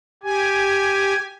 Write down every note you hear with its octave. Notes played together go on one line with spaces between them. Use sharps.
G4 G#5